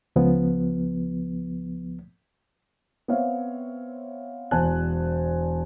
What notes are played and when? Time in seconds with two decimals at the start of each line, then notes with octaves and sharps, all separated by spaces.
0.16 C#2 F3 B3
3.08 B3 C4 C#5 E5 F5
4.51 E1 E2 C5 G#5 A5 F#6